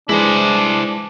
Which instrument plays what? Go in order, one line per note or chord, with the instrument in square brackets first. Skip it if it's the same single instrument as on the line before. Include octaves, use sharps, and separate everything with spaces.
[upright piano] E3 G#3 [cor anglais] D4 [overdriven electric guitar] E4 C5